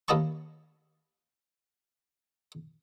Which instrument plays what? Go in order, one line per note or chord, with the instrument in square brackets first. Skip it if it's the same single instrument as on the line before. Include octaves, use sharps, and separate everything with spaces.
[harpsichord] D#2 A#3 E4 D#5 A5 C#6